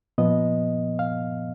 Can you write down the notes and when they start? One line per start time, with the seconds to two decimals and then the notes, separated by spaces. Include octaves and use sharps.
0.18 A#2 F3 B3 D#5
0.99 F5